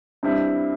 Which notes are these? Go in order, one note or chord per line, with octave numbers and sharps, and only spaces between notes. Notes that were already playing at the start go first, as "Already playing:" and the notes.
G2 G3 C4 E4